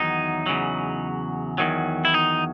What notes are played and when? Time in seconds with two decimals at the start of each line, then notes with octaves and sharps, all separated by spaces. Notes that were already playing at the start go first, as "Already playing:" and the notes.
Already playing: E2 D#3 F#3 D#4
0.46 E2 C#3 F#3
1.58 E2 D#3 F#3
2.05 E4
2.14 D#4